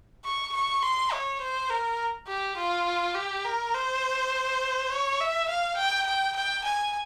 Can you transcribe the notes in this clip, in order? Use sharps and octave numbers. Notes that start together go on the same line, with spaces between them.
C#6
C#6
C6
C#5
C5
A#4
G4
F4
G4
A#4
C5
C#5
E5
F5
G5
G5
G5
G#5